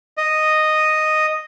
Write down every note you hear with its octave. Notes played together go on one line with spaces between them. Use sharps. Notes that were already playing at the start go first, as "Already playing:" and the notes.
D#5